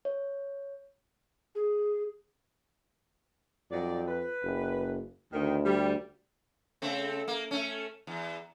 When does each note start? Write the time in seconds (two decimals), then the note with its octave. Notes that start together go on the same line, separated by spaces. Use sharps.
0.05 C#5
1.55 G#4
3.71 F2 F#3 D#4 D5
4.08 B4
4.43 F#1
5.33 D2 D#3
5.65 G3
6.82 C#3 A3 C4
7.28 A#3
7.51 A3 C#4
8.07 E2